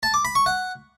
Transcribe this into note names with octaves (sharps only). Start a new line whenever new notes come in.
A5
D6
B5
C#6
F#5